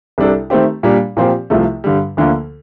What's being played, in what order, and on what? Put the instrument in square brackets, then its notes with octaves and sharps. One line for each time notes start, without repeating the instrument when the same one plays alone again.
[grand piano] C2 C3 G3 D4 A4
D#3 A3 C4 G4
A#2 G3 D4
A#2 F3 C4 G4
C2 C3 F3 A3
G2 D3 G3
D2 D3 F3 A#3